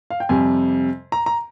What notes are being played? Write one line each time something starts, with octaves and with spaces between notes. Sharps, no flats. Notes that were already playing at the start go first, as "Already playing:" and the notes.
F5
G5
F2 C3 G3 G#5
A#5
A#5